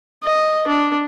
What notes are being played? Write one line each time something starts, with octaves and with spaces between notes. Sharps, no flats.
D#5
D4